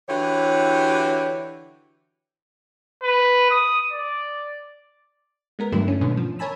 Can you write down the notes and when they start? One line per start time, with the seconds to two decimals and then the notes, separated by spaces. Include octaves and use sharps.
0.09 D3 E3 E4 F#4 G4 C#5
3.03 B4
3.51 D#6
3.93 D5
5.59 G#3 B3 A#4
5.72 G2 D3 F#3 A3 E4
5.88 A3 C#4
6.01 G#2 B2 D3 D#3 B3 C#4
6.17 F3
6.39 A#4 C#5 G#5 A5 B5 E6